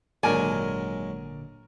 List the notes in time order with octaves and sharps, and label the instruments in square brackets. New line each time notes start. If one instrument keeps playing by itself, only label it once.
[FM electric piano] G#1 A#2 D3 [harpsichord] F#3 G#3 [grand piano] A#4 D5 [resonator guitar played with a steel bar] G#5